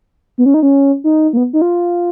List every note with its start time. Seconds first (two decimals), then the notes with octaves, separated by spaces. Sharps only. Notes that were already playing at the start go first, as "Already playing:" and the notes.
0.38 B3
0.46 C#4
0.54 D#4
0.63 C#4
1.04 D#4
1.33 A#3
1.37 B3
1.53 D#4
1.62 F4